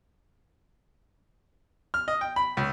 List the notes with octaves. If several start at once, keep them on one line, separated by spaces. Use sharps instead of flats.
F6
D#5
G5
B5
C#2